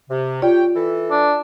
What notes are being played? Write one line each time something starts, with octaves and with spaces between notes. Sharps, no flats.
C3
F4 G4 C#5 D5 G5
E3 A4
D4